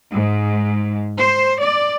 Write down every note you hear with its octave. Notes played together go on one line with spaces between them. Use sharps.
G#2
C5
D5